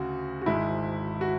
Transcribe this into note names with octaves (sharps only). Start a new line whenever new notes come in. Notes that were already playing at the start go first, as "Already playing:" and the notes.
Already playing: D2 C#3 F#4
F#4
G#1 G#2 G#3 E4
F#4